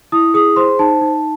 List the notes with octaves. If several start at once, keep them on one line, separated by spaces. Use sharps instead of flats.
E4 D#6
G#4 D#6
C5 C6
D#4 A5
D#4